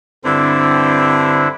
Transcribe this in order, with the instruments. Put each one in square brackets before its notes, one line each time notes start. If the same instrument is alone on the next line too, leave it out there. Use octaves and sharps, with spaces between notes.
[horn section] G2 C4 [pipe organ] D3 D4 E4